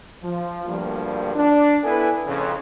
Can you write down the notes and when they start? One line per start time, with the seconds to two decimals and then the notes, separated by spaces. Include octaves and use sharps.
0.23 F3
0.66 D2 G2 F3 G3 A#3
1.35 D4
1.83 B3 D4 E4 A4 B4 G#5
2.26 F2 A2 C#3